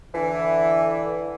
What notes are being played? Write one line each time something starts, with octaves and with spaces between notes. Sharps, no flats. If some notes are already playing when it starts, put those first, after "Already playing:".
D3 E3